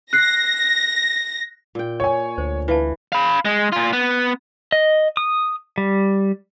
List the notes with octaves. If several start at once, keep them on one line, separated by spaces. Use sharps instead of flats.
F#6 A#6 C7
A#2 G5
C#5 G#5
D2 C5
E3 B4 F5 A5
F5 B5
G#3
A#2 F4
B3
D#5
D#6
G3